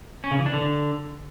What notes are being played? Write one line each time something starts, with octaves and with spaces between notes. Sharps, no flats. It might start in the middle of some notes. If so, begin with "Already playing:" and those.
C#4
C#3
E3
D4
D3